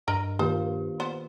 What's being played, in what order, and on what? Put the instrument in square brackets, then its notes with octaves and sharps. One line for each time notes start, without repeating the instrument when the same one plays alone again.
[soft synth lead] G2 [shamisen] A#4 D#5 A#5
[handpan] D#3 A#3 F4 [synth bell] G4 [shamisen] C5
[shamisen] B3 C5